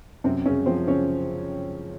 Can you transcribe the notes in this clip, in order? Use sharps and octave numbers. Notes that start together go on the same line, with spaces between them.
F#2 C3 C4
F#2 C#3 C#4
F3 C4 C5
C#3 C#4 C#5